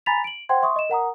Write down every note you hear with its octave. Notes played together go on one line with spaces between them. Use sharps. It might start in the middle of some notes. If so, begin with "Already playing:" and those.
G#5 A#5 B5 A6 B6 F7
D7 F#7
C5 F#5 G5 C6 G#6
E5 C6 C#6 D#6
D#5 E7
A#4 F#5 A#5 D#6